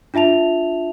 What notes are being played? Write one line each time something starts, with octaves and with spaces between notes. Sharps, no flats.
D4 F4 E5 A5 F7